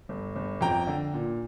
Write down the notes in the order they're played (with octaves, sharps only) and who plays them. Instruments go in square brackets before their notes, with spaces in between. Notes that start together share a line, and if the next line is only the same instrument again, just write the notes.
[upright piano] G1
G1
F2 G5 A#5
D3
A#2